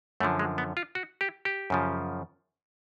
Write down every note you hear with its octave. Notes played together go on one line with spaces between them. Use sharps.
F#2 D3 F3 A3
G#3
B3
F4
F#4
G4
G4
F#2 C#3 F3